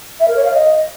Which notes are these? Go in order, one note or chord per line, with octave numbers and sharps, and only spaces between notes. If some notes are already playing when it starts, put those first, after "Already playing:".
E5
A#4
C#5
F5
D#5